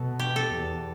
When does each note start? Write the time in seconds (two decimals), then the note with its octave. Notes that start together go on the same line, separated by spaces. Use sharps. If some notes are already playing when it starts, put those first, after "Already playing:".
Already playing: B2 A4
0.19 G4
0.36 A4
0.53 E2